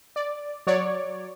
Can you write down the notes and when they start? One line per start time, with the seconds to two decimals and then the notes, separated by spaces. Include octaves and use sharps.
0.16 D5
0.67 F#3 C#5 D5